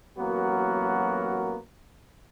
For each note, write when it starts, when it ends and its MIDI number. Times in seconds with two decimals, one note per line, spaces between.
0.18 1.57 33
0.18 1.57 54
0.18 1.57 58
0.18 1.57 59
0.18 1.57 66
0.18 1.57 70